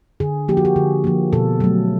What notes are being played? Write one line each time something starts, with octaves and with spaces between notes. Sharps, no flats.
D3 G#4
F3 A#3 G4
F#4
G4
D3 G#4
F3 A#3
B2 A4
F#3 A3